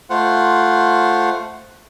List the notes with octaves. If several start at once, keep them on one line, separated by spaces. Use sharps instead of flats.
A3 F4 C5 F#5